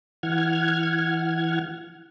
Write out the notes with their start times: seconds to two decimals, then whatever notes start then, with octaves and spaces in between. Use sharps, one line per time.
0.23 E3 F#5 F6 G#6